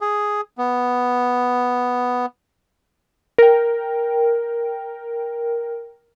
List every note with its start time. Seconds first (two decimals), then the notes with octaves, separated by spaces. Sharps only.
0.01 G#4
0.58 B3
3.38 A#4 G5